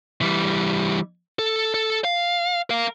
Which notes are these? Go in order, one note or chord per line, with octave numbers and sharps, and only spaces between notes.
E3 G3
A4
A4
F5
A#4 F5